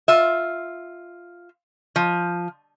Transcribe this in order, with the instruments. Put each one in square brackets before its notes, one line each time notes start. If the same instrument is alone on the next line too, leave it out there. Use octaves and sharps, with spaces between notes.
[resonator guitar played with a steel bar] F4 E5
F3